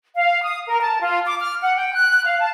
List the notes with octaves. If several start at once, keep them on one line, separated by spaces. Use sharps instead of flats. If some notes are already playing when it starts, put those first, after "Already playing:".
F5
D#6
A#4
A5
F4
D6
F6
F#5
G5
F#6
F5
A5